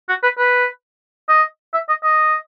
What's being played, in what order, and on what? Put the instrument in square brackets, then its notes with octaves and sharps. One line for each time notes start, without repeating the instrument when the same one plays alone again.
[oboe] F#4
B4
B4
D#5
E5
D#5
D#5